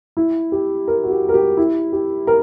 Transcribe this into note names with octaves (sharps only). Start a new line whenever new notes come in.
E4
G4
A#4
F#4
G4
A#4
G4
E4
G4
A#4